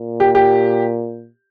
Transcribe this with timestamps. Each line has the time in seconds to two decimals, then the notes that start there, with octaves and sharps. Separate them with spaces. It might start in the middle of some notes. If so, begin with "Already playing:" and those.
Already playing: A#2
0.20 G4
0.35 G4